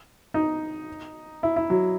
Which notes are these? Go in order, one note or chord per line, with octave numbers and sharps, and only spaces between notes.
D#4
E4
E4
F#3